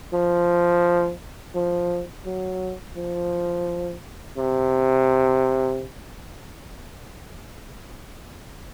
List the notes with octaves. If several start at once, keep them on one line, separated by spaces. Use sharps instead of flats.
F3
F3
F#3
F3
C3